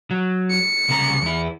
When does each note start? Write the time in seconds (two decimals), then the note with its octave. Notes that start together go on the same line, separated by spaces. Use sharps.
0.11 F#3
0.50 C#7
0.89 C2 C#3 A#5
1.22 E2 E4